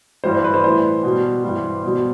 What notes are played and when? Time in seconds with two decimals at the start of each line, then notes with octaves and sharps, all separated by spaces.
0.24 G2 E3 G3 C5
0.35 C5
0.44 B4
0.54 C5
0.64 A2 E3 G3 C5
1.03 B2 G3
1.44 G2 E3 G3
1.84 B2 G3